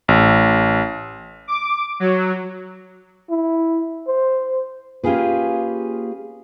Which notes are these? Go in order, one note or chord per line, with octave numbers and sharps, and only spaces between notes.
A1
D6
F#3
E4
C5
A#3 C#4 F4 G4 G#4 B4